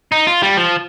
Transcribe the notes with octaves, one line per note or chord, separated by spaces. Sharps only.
D#4
F4
G3
F3